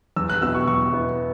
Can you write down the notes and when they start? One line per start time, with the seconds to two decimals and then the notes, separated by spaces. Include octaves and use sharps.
0.16 E2 E6
0.30 F#6
0.42 B2 B3 E4 E6
0.55 C#6
0.67 E2 C#6
0.93 B2 B3 E4